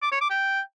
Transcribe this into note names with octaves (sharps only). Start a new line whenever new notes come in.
D6
C#5
D6
G5